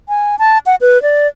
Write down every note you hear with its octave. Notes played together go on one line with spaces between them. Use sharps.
G#5
A5
F#5
B4
D5